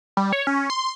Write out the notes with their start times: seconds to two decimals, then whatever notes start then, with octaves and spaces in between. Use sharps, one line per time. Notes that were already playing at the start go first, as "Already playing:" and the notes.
0.17 G3
0.33 C#5
0.47 C#4
0.70 C6